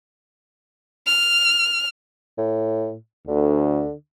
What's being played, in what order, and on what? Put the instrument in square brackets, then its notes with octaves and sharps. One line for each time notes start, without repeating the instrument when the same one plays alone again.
[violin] F6
[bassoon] A2
[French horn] D2 [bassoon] D3